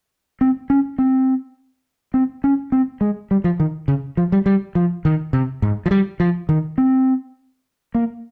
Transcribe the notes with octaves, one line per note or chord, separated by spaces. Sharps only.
C4
C#4
C4
C4
C#4
C4
G#3
G3
F3
D#3
C#3
F3
G3
G3
F3
D#3
C3
G#2
F3
G3
F3
D#3
C4
A#3